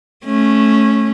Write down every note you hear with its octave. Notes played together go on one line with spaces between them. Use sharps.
A3 C#4